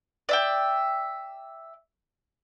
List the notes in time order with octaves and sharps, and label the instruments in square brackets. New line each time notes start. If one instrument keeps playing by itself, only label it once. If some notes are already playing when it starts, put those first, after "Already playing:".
[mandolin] D5 E5 G5